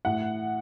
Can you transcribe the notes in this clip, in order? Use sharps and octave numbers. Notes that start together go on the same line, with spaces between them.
A2 F#5